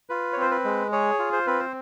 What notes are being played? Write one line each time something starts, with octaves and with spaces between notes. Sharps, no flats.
F4 B4
C#5
C4 C5
B4
G#3
G#4 C#5
F4
C5
C4 B4
C5